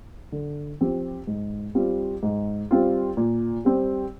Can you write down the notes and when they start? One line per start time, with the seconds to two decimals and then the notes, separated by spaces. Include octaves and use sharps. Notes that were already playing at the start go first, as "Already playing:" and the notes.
0.32 D3
0.81 F3 C4 G4
1.27 G#2
1.75 G3 C4 F4
2.23 G#2
2.71 G3 C4 F4
3.17 A#2
3.65 G3 C4